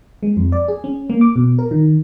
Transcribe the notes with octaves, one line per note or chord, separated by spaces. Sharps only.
G#3
F2
D5
G#4
C#4
A#3
D6
B2
A#4
D#3